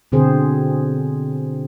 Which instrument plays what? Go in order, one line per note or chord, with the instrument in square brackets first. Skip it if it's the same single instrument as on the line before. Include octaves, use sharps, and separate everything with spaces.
[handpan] B2 D3 C4 G#4 C5